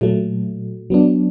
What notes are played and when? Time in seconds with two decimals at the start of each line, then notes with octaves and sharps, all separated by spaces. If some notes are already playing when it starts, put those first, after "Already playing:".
0.01 A#2 F#3 A3
0.90 F#3 B3 D4